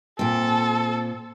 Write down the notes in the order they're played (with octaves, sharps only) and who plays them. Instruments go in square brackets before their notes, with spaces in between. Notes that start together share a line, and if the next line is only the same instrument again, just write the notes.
[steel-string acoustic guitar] A#2 C4 [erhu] A4